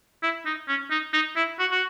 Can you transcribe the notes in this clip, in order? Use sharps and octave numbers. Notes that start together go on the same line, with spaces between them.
E4
D#4
C#4
D#4
D#4
E4
F#4
F#4